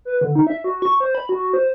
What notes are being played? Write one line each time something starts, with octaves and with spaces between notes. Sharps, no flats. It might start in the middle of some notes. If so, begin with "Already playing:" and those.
B4
D3
D#4
E5
F#4
C#6
C5
B5
F#4
C5